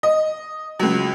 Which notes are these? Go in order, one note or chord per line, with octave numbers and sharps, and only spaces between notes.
D#5
C#2 F#3